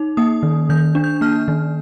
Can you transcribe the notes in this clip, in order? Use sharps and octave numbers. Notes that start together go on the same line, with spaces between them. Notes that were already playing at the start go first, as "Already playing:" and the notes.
Already playing: D#4
A#3 D#6
D#3
D#3 G6
D4
G6
A#3 F6
D#3